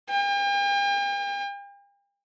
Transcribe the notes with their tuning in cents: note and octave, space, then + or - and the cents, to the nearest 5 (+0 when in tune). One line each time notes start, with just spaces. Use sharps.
G5 +45